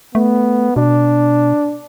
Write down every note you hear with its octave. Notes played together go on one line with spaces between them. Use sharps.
A3 B3
B2 D4